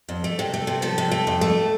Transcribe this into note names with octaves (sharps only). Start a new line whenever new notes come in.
F2
A3
C3
A3
C3
F3 A4
C3
A3
F2
A3